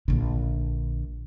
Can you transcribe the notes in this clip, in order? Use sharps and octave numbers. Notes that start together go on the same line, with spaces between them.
A#1 D3